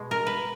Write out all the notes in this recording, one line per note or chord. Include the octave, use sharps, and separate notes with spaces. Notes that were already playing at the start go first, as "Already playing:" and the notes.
Already playing: B2 G#3
A#4
B4